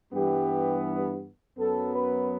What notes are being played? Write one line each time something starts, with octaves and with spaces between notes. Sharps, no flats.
G2 E3 G3 B3 G4
F#2 F#3 B3 A4
B4